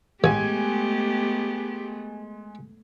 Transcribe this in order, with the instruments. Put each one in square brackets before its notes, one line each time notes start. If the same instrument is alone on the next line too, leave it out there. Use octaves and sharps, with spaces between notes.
[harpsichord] A1 [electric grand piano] G#3 G#5 G#6 [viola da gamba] A3 B3 [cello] G4